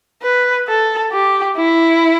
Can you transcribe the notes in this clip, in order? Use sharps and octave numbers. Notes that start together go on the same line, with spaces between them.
B4
A4
G4
E4